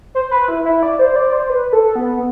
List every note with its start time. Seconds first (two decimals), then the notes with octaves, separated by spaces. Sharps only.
0.15 C5
0.31 B4
0.48 E4
0.65 E4
0.83 D5
0.99 C5
1.16 D5
1.33 C5
1.50 B4
1.73 A4
1.96 B3